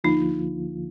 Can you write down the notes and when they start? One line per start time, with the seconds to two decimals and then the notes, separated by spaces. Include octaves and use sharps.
0.04 D2 D3 F3 A#3 D#4 F4